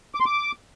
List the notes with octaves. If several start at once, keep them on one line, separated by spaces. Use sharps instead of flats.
D6
C6
D6